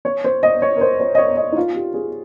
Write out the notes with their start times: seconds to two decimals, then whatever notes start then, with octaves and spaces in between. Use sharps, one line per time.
0.05 C#5
0.24 C5
0.43 D#5
0.62 C#5
0.77 A#4
0.81 C5
1.00 C#5
1.15 D#5
1.18 C#5
1.37 D#5
1.52 D#4
1.57 F4
1.75 G4
1.94 G#4